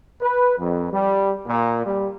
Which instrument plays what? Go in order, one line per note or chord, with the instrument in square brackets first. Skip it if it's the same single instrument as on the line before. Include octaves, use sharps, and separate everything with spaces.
[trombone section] B4
F2
G3
A#2
G3